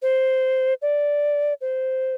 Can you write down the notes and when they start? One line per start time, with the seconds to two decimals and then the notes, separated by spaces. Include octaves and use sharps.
0.02 C5
0.82 D5
1.61 C5